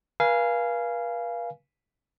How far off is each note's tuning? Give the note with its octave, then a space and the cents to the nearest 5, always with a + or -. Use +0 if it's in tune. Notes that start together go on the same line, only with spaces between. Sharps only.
B4 -45 F5 -15 G#5 +0